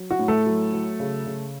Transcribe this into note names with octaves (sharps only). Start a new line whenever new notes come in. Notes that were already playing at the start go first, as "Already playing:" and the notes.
Already playing: F#3
F#4
A2
A3 A4
F#3
F#3
C#3
C#3